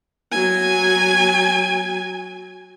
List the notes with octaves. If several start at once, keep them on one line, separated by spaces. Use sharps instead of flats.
F#3 G#5